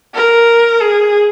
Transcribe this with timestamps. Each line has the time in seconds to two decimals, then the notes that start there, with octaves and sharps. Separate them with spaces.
0.14 A#4
0.81 G#4